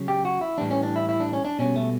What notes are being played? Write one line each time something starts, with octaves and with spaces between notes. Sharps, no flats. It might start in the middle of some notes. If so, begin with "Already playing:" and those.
Already playing: C#3 F#3
G4
F#4
E4
A2 E3 G3 D4
C#4
D4
E4
E4
D4
C#4
D4
B2 G3 C#4
A3